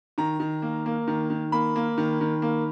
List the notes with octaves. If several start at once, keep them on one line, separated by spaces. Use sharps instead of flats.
D#3 A#5
D#3
A#3
A#3
D#3
D#3
A#3 B5
A#3
D#3
D#3
A#3